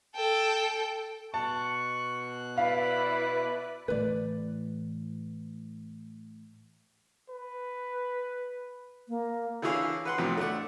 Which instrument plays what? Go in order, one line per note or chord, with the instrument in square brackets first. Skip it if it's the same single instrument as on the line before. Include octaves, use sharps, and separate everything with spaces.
[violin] A4 G5
[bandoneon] B2 F#6 [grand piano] A5 [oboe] C#6
[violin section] E4 B4 D5 [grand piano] F5 [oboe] B5
[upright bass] A2 E3 [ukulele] B4 D5
[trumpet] B4
[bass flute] A#3
[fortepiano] D3 E3 E4 G#4 C#5 F5
B4 F#5 C6
F2 A2 C3 F#3
A3 D4 F#5